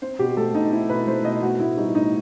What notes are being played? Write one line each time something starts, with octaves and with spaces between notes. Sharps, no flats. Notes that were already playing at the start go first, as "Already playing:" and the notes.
C4 C5
B2 G4
A3 A4
B2 D#4
C4 E4
B2 B4
A3 C5
B2 D#5
B3 F#4
A2 E4
G3 D#4
A2 D#4